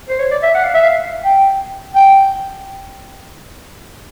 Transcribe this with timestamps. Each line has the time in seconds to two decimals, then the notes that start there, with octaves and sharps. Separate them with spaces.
0.09 C5
0.19 C#5
0.31 D5
0.43 E5
0.55 F#5
0.64 F5
0.74 E5
0.83 F5
1.24 G5
1.95 G5